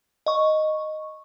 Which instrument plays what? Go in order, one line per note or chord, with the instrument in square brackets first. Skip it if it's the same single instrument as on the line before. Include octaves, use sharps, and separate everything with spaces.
[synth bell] D#5 C#6